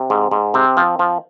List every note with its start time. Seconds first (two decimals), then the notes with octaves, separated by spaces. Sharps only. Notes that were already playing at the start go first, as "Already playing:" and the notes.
Already playing: C3
0.10 G#2
0.31 G#2
0.54 C3 C4
0.77 F3
0.99 F3